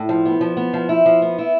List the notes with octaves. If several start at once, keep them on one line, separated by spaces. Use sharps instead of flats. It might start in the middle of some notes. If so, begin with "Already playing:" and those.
Already playing: A2
F3
B3
F3
B3
F3
E4
F3
B3
E4